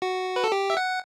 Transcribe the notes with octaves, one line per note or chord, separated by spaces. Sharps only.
F#4
B4
A4
G4
E5
F#5